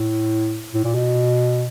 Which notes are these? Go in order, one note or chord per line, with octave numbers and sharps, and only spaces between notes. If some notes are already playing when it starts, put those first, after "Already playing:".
Already playing: A2
A2
A#2
B2